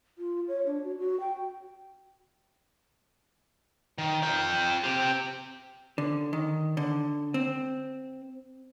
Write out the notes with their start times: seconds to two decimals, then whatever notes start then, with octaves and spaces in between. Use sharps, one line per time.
0.18 F4
0.48 C#5
0.66 D4
0.83 F#4
0.99 F#4
1.20 G5
3.98 D#3
4.23 F4 G5
4.84 C4 G4
5.98 D3
6.33 D#3
6.77 D3
7.34 C4